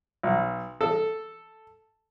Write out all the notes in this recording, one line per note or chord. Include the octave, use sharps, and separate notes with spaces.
B1
A4